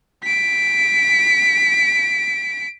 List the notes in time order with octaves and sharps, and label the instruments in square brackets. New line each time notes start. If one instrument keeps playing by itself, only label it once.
[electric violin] B6 D7